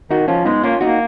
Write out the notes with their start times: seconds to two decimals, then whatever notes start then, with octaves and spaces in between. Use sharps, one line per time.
0.10 D#3 D#4 F#4
0.28 F3 C#4 F4
0.45 G#3 B3 D#4
0.63 A#3 C#4 F4
0.81 A#3 D#4 F#4